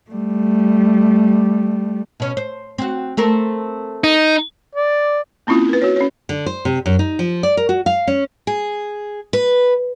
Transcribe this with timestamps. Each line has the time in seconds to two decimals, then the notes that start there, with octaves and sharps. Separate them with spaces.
0.11 G3 A3
2.20 B2 C#4
2.37 C5
2.78 C4 F#4
3.17 A3 C4 A#4
4.04 D#4
4.75 D5
5.47 A#3 C4 C#4 E4 F4
5.69 A#4 B4
5.82 F#4 C#5
5.96 C#4 C#5
6.29 D3
6.46 C5
6.65 C3
6.86 F#2
6.99 D#4
7.19 F3
7.43 D5
7.57 A#4
7.69 F#4
7.86 F5
8.07 C#4
8.47 G#4
9.33 B4